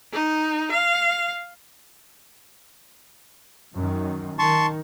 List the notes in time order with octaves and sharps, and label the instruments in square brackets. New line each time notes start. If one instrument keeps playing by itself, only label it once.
[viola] D#4
F5
[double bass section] F#2 D#3
[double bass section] D#3 [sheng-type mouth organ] A5 C6 C#6